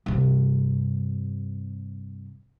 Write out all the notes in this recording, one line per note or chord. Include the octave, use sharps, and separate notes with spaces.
G2 C3